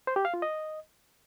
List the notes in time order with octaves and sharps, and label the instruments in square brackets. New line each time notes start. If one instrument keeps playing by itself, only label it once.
[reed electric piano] C5
G4
F5
F4
D#5